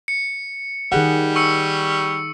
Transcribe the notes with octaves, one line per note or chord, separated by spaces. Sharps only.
C#7
D#3 G3 G#4 F#5
C#6 E6 C#7